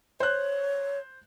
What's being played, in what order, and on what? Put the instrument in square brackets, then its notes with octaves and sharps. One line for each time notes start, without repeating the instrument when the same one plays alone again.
[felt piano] C5 F#6 [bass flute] C#5